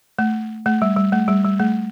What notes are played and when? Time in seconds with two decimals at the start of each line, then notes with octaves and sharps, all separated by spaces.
0.19 A3
0.66 A3
0.82 G3
0.96 G3
1.12 A3
1.28 G3
1.44 G3
1.59 A3